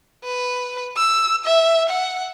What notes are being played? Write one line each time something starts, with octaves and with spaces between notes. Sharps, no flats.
B4
E6
E5
F#5